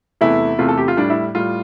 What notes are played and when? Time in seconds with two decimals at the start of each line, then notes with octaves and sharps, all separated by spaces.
0.21 E2 C3 E3 A3 E4
0.59 E2 C3 E3 A3 F4
0.68 A4
0.78 G4
0.88 F4
0.97 A2 G3 D4
1.10 E4
1.35 A2 G3 F4